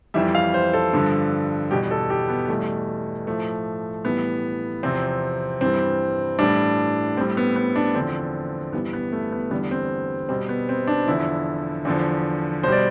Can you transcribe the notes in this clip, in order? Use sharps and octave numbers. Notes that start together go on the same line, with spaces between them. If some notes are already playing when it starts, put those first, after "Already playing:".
F2 E3 G3 E5
F5
C5
A4
G2 D3 F3
E2 B2 G3 G4
A4
G4
B3
E2 B2 G3 A3
A2 F3 A3
A2 E3 G3 B3
E2 C3 F3 C4
G2 E3 G3 C4
A2 E3 G3 D4
A2 G3 C4
B3
B3
D4
E2 D3 F3 C4
G2 E3 G3 B3
B3
A3
B3
E2 D3 G3 B3
C4
B2 G3 C4
B3
C4
D4
E2 D3 F3 E4
E2 D3 F3
B2 C5
G3 D5